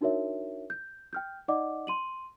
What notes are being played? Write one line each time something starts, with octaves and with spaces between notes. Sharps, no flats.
D4 D#4 F#4 A#4 C#5 E5
G6
G5 F6 G6
D#4 D5 D#5 F#5 D6
C6 D#7 F#7